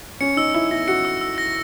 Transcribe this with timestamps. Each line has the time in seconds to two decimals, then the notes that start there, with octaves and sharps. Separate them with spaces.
0.21 C#4 C#7
0.37 D#4 E6
0.54 E4 E6
0.71 E4 A#6
0.88 F#4 C#7
1.05 E6
1.21 E6
1.38 A#6